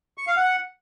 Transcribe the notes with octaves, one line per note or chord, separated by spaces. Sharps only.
C#6
F5
F#5